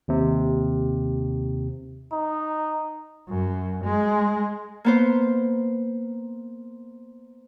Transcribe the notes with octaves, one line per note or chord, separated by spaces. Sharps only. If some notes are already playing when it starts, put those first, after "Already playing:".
D#2 C3
D#4
F#2
G#3
A#3 B3 C5